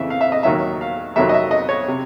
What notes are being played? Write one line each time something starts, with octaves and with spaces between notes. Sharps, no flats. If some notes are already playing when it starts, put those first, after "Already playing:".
Already playing: F2 C#3 E3 E5
F5
E5
D#5
D#2 D#3 F#3 E5
F5
F2 C3 D#3 F#3 E5
D#5
E5
D#5
C#5
C3